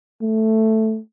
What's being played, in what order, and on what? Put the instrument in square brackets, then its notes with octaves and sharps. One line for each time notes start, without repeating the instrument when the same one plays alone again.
[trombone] A3